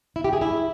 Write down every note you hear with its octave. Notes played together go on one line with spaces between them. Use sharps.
E4
G4
G#4
E4